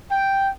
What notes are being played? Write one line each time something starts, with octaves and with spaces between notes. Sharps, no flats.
G5